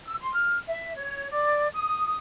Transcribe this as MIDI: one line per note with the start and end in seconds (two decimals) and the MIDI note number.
0.05 0.15 88
0.20 0.33 84
0.34 0.60 89
0.67 0.91 76
0.96 1.28 73
1.31 1.67 74
1.74 2.16 87